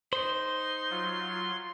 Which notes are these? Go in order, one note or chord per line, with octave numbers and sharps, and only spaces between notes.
D#4 C5 B5 C6
F#3 F4